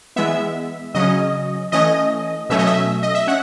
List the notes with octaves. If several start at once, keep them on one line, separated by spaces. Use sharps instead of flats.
E3 G#3 B3 E5
C#3 F#3 C#4 D#5
E3 A3 C#4 D#5
B2 F#3 A3 C#4 E5
D#5
E5
D#5
E5
C#4 F#5